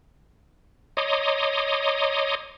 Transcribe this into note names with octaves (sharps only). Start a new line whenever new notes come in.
C#5 D#5 A#5 C6 D6 D#6